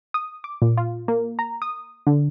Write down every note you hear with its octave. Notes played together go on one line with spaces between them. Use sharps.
D#6
D6
A#2
F4
A#3
A#5
D#6
D3